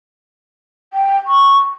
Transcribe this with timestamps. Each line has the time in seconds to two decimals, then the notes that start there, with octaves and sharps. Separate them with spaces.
0.93 G5
1.27 C#6